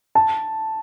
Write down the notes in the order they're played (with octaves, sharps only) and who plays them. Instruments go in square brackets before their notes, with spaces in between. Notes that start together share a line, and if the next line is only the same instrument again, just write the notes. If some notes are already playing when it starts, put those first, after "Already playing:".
[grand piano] A5